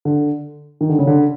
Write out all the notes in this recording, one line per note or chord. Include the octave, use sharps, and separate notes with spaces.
D3
D#3
D3
C#3
D3